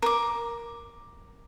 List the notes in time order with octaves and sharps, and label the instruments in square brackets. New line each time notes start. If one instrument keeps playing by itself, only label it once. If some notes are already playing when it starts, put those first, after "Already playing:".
[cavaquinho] A#4 D6